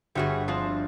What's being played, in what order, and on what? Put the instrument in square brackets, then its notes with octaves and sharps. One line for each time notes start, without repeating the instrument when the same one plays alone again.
[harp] G1 E5 [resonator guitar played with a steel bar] G3 F#4 G#4
[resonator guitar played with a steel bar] F3 C4 D4 [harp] A5 D#6